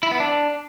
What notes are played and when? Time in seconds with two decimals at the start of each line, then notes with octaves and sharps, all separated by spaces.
0.03 E4
0.11 B3
0.20 D4